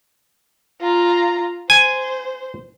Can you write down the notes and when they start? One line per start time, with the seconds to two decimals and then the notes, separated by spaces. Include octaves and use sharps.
0.81 F4 A#5
1.70 C5 G#5